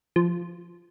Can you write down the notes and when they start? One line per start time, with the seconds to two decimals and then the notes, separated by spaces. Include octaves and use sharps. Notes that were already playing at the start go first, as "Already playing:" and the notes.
0.16 F3